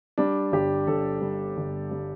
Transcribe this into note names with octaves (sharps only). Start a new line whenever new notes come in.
G3 D4
G1 G4
G1 A4
G3
G1
G3